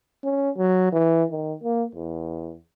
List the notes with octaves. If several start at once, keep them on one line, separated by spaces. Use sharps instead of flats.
C#4
F#3
E3
D#3
A#3
E2